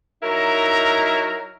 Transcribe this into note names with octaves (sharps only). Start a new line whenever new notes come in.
F#3 D#4 E4 A#4 A#5